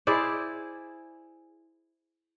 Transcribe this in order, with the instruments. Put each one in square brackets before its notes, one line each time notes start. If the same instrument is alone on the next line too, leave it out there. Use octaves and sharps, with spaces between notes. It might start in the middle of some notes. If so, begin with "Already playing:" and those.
[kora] E4 G#4 C5 D5